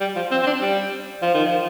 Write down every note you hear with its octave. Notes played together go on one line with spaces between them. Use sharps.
G3
F3
C4
C4
D4
G3
F3
D#3
F3